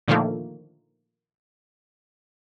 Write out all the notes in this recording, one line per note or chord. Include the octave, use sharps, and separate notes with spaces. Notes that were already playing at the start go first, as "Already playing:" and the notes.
A#2 D3 D#3 F3 A3 A#3